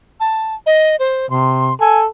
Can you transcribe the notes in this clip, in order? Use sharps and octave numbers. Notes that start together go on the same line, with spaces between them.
A5
D#5
C5
C3 C6
A4 G#5